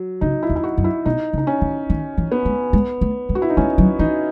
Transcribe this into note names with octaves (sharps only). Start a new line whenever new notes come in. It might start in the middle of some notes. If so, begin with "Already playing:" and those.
Already playing: F#3
C#3 D#4
E4
E2
E4
F#4
F#2
E4
B2 D#4
C#3
D#4
C#4
D#3
D#3
E3
B3
G#3
G#3
A3
G#3
F#4
E4
D#4
G#3 C#4
F#3
E3 D#4